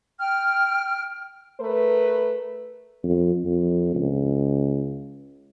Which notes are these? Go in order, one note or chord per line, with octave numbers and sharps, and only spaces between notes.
G5 F6
A3 A#4 B4
F2
F2
C#2